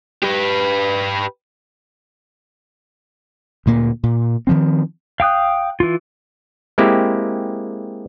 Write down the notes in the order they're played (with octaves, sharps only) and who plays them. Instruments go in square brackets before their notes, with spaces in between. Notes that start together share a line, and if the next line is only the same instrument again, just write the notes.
[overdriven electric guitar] G4 B4
[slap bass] D2 A#2 A#3
A#2
D#3 F3 C4
[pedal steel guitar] F5 G5 D#6 F#6
E3 F4
[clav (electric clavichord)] G#3 A#3 C4 E4 G4